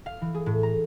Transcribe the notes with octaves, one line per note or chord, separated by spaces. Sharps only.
F5
E3
G#4
A2
A#5